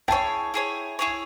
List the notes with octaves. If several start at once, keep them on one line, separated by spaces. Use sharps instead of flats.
E4 G#4 C#5 G5 A5
E4 G#4 C#5
E4 G#4 C#5